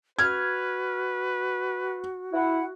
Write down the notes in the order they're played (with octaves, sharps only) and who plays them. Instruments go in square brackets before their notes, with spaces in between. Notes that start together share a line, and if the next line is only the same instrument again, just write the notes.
[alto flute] F#4 [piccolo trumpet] B4 [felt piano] F6 G#6
[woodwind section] E4 F#5